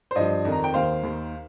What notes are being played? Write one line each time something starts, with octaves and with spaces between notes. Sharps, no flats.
C5
G2 F3 D#5
F2 D#3
A#5
G5
D#2 D#3 C5 F5
D#2 D#3